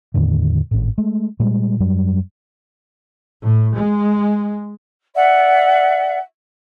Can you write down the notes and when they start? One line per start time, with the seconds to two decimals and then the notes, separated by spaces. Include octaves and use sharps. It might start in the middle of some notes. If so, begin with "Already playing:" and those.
0.14 E2 A2 D3 D#3
0.71 G#1 A2
0.98 G#3 A3
1.40 A#2 G3 G#3
1.80 F#2 F#3 G3
3.43 A2
3.75 G#3
5.14 D5 E5 F#5